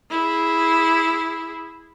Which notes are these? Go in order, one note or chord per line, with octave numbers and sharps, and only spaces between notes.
E4 G#4